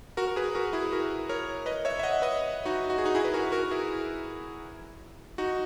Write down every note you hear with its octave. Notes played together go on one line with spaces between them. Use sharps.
F#4 A#4
A#4
G#4 B4
F#4 A#4
E4 G#4
F#4 A#4
A#4 C#5
B4 D#5
C#5 E5
E5
D#5 F#5
B4 D#5
D#4 F#4
F#4
G#4
D#4 F#4
E4 G#4
B4
F#4 A#4
F#4 A#4
E4 G#4
D#4 F#4